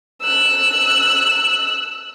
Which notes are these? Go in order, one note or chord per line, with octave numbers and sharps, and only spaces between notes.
E6 F#6